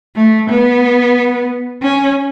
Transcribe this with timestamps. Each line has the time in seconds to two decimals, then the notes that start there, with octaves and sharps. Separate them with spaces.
0.16 A3
0.50 B3
1.82 C#4